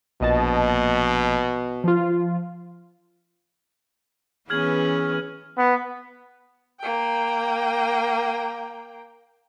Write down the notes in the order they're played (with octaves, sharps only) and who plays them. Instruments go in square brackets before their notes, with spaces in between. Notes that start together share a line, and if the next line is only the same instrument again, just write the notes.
[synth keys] A#1 D#5 A5 [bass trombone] B2
[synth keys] F3 F4
[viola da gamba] E3 B3 C#4 [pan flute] G#4 [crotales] F6 G#6 F#7
[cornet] B3
[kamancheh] A#3 G5